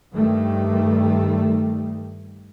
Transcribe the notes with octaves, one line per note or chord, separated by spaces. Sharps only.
G2 D#3 G3 A3